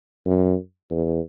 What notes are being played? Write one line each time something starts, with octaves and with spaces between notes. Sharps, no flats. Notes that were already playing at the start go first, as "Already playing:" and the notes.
F#2
E2